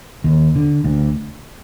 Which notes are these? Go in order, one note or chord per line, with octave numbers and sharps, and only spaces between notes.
D#2
D3
D2